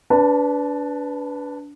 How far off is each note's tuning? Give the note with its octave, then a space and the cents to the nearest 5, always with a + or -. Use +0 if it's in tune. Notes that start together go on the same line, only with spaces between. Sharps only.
D4 -25 B4 +0 A5 +15